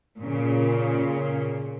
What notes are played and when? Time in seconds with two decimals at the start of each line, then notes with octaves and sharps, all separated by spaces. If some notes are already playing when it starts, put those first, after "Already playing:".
0.17 A#2 C#3